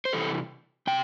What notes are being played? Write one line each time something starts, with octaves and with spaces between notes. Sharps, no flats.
C5
C3 E3 G3 A4
C3 G5